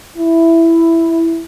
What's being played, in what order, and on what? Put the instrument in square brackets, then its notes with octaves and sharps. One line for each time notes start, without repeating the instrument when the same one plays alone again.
[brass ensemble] E4